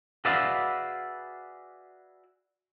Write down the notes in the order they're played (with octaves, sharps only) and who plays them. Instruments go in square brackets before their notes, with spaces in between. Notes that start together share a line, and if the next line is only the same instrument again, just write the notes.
[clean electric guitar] F#4 G#4 B4 D5 E5 F5